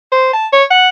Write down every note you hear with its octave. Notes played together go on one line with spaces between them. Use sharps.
C5
A5
C#5
F#5